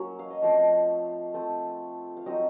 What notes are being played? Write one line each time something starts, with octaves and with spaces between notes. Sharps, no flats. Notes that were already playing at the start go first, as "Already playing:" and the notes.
Already playing: F#3 A#3 C#4
F5
D#5
F3 A3 C4 F4 C#5
A3 C4 F4
F5
F#3 C4 D#4 D#5